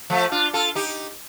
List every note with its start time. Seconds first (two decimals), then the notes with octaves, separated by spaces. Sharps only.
0.10 F3 A3
0.31 D4 F4
0.53 F4 A4
0.75 D#4 G4